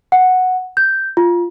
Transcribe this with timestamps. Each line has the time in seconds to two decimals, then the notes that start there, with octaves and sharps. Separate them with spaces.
0.12 F#5
0.77 G6
1.17 F4